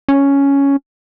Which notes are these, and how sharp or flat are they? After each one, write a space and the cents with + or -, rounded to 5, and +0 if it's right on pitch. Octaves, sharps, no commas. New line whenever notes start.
C#4 +5